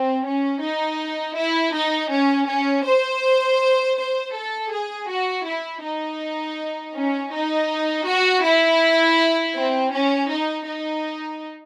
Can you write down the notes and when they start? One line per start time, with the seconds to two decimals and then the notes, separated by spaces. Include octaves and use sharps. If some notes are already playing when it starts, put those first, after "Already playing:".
Already playing: C4
0.26 C#4
0.62 D#4
1.37 E4
1.74 D#4
2.11 C#4
2.48 C#4
2.86 C5
3.98 C5
4.34 A4
4.72 G#4
5.10 F#4
5.46 E4
5.83 D#4
6.95 C#4
7.33 D#4
8.07 F#4
8.44 E4
9.55 C4
9.93 C#4
10.30 D#4
10.67 D#4